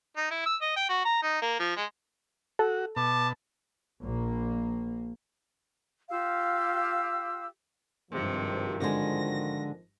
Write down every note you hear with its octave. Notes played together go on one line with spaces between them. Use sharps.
D#4
E4
E6
D#5
G5
F#4
A#5
D#4
A#3
F3
G#3
F#4 A4
B2 A5 D6
A#1 A#3
F4 G4 F5 E6
G#1 G2 C3 D#3 F3
D3 G#3 A#6